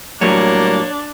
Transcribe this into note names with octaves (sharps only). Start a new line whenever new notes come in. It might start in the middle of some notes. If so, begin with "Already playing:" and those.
A2 F#3 G3 A#3 D4 C#5